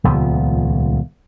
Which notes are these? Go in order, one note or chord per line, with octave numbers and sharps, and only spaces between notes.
D#1 C#2 F3 B3